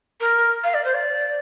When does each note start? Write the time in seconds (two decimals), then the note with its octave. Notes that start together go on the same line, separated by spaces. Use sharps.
0.20 A#4
0.64 F5
0.74 D5
0.85 C5
0.94 D5